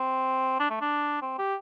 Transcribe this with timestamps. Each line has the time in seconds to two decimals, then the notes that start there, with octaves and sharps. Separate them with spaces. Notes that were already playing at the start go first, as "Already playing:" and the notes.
Already playing: C4
0.60 D4
0.70 A3
0.81 D4
1.22 C4
1.39 G4